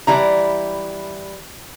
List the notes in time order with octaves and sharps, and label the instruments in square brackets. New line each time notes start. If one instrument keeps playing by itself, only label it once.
[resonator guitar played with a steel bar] E3 G3 E4 A#5